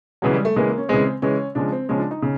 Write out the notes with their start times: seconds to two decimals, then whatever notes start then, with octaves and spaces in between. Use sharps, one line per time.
0.22 C#3 E3 F#3 G#3
0.34 G3
0.45 A3
0.56 C#3 E3 G#3 A#3
0.78 C#4
0.89 C#3 E3 G#3 C4
1.22 C#3 E3 G#3 C#4
1.55 C#3 F3 G#3 D4
1.72 C4
1.89 C#3 F3 G#3 C#4
1.99 D4
2.11 D#4
2.22 C#3